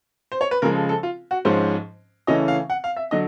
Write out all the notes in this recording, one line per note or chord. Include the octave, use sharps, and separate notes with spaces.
C5
C#5
B4
C#3 F3 G#3 A#4
A4
A4
F4
F#4
G#2 F3 G#3 C#4 C5
C#3 E3 A3 C#4 D#5
F5
F#5
F5
E5
D3 F#3 D#5